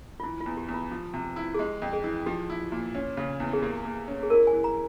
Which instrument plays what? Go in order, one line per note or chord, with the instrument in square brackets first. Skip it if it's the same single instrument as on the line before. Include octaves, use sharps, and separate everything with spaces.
[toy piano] F4
[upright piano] E3 [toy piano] E4
[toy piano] F4
[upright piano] E2
[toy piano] G4
[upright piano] E2
[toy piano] F4
[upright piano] F3
C3
E4
[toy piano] G#4
[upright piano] G#3 [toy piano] G4
[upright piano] F2
[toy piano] G#4
[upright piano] E3
[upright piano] F3 [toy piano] G4
[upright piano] E4
A#2
C#4
C#3
E2
[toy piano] G#4
[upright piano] A#3 [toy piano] G4
[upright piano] A#3
C#4
[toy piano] G#4
[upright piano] E4 [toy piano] A#4
[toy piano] G#5
[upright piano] E3
[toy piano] A#5